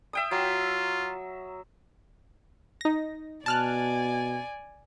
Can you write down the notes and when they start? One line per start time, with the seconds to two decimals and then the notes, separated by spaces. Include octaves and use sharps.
0.13 E5 G5 D#6
0.31 F#3 F4
2.81 D#4 A#6
3.46 B2 D5 G#5 A5 F6 F#6